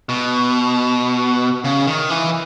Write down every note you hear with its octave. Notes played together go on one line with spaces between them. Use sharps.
B2
C#3
D#3
E3